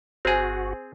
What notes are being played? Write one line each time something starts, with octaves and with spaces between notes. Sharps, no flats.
G1 C4 F#4 G#4 C5 G#5